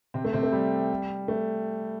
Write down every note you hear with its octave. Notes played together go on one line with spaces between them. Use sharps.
C3 C4
A3
C3 C4
A3
G3
A3